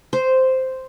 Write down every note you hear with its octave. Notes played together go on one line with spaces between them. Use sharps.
C5